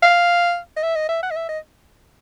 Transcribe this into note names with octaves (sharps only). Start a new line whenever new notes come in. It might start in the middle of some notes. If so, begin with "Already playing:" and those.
F5
D#5
E5
D#5
E5
F#5
D#5
E5
D#5